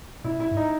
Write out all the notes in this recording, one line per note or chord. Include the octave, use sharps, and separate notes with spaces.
A#2 E4
E4
G#2
D#4